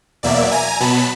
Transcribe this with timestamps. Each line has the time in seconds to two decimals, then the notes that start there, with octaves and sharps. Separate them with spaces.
0.23 E2 B2 F#3 A#3 D5 E5
0.51 G#5 A#5
0.80 B2 F#3 B3 A5 B5